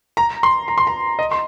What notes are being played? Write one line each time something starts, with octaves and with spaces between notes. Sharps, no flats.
A#5
C6
A#5
C6
A#5
D#5
C6